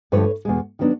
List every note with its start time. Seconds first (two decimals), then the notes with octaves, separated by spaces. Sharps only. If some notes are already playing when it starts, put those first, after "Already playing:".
0.12 G2 D3 F3 A3 B4 C#5
0.45 E2 B2 G#3
0.79 D#3 F#3 B3 D4